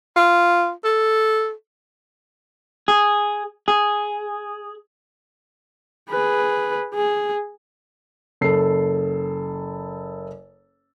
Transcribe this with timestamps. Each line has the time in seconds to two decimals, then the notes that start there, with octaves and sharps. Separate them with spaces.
0.16 F4
0.84 A4
2.88 G#4
3.68 G#4
6.10 G#4 B4
6.94 G#4
8.41 F#1 A4 C7